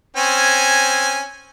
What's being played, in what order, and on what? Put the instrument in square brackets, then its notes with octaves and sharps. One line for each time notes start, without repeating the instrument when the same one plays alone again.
[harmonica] C4 C#4 G#5